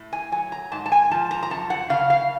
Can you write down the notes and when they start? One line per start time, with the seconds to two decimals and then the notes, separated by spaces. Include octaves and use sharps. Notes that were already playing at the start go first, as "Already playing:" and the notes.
Already playing: A2
0.13 G#5
0.32 F#3 G#5
0.52 A#5
0.72 G#2 A5
0.86 A5
0.92 G#5
1.11 F3 A5
1.31 A#5
1.43 A#5
1.50 F#2 A5
1.70 F#5
1.90 C#3 F5
2.10 F5